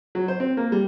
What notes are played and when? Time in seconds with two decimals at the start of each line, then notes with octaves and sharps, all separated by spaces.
0.15 F#3
0.28 C5
0.40 C4
0.57 A#3
0.72 G3